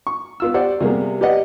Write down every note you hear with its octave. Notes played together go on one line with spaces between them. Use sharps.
C#6
B3 F4 E6
G4 C5 D5 F#5
C3 G3 A#3 B3 G#4
G4 B4 D5 D#5 F#5